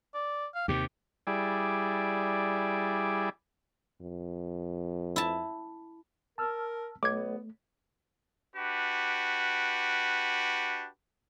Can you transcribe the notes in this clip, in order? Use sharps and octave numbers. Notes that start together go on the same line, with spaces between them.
D5
F5
D#2 C3 G4
G3 E4 G#4 D5
F2
E4 A5
A#4 A5 E6 F6
B1 A3 B3 D6 G#6
D4 F#4 G4 B4